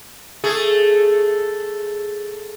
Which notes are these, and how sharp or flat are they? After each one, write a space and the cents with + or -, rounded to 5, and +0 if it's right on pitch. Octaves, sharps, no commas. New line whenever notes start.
A3 +0 G#4 +0